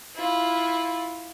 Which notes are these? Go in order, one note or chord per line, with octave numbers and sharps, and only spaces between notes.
E4 F4